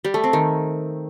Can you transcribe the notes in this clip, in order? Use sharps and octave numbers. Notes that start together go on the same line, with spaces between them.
G3
A3
C4
D#3